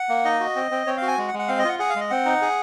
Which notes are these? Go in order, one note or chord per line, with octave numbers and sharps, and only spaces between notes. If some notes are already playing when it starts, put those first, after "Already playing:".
Already playing: F#5
A#3
D#4 D#5
F#4
C4
C4
C4 C#5
F#4 F5
G#5
G#3
F#5
G#3
F#5
C4 F5
D#5
F4 F#5
G#4 F#5
F5
G#3 D#5
C4 F#5
D#4
G#4